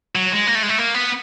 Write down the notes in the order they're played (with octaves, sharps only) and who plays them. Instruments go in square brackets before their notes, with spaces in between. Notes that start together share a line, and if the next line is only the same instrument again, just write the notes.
[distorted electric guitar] F#3
G#3
A#3
A3
G#3
A3
A#3
B3